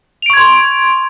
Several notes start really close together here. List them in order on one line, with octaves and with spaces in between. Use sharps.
F7 D7 C#6 G#6 C6